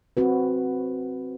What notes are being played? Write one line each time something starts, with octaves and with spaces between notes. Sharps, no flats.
C4 F#4 B4